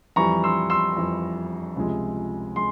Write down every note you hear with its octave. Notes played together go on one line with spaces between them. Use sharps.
F2 E3 G3 A#5 C#6
C6 E6
C6 E6
F2 E3 G3
C#2 C3 F3 G#3
G#3 C6